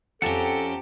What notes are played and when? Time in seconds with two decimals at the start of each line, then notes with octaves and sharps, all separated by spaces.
0.22 F2 C4 C#4 G4 A4 F#5 A5 A#5